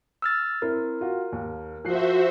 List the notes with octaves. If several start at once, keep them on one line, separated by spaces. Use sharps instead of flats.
E6 F6 A6
C4 E4 A#4
F4 F#4
D#2
F3 F#4 C5 E5 F#6 C7